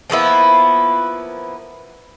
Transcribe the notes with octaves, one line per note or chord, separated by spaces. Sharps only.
F3 A#3 B3 E4